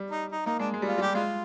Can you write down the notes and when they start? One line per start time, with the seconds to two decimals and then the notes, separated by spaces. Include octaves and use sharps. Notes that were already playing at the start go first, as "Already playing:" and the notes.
Already playing: G3
0.11 D#4
0.32 D#4
0.46 A#3 D#4
0.59 G#3 D4
0.74 G#3
0.82 G3
0.88 F4
0.98 G3
1.02 G4
1.15 G#3 F4